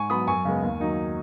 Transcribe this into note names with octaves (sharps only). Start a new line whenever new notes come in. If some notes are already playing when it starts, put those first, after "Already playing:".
Already playing: G#2 G#5 C#6
F#3 B3 B5 D#6
F#2 G#5 C#6
C#3 G#3 B3
D#2
D#3 F#3 D#4